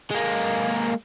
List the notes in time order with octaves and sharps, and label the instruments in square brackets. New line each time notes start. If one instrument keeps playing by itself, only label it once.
[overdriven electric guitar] G#3 A#3